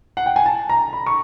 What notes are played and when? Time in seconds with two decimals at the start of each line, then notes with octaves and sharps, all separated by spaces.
0.17 F#5
0.26 G5
0.36 G#5
0.46 A5
0.69 A#5
0.93 B5
1.06 C#6